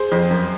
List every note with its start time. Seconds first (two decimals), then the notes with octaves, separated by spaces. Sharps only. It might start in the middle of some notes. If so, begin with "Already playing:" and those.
Already playing: G#4 C5
0.12 F2
0.31 F#2